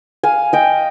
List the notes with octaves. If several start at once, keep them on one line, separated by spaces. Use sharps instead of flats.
F5 G#5
D#5 G5